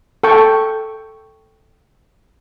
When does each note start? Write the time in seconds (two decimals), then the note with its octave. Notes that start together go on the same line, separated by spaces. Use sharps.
0.23 A4 G5 C#6